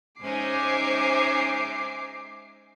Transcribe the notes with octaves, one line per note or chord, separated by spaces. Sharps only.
G#3 C#4 D#4 C5 E5 G#5 D6 C7